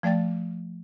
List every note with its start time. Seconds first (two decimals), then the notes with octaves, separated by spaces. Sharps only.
0.03 F3 A3 D5 G5 A6